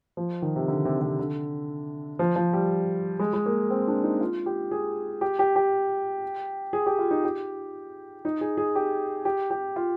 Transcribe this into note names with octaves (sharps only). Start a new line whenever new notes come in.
F3
D#3
C3
D3
C3
C3
D3
F3
F3
G3
G#3
G#3
A#3
C4
D4
D#4
F4
G4
G#4
G4
G4
G4
G#4
G4
F4
D#4
G4
D#4
G#4
G#4
G4
G4
G4
F4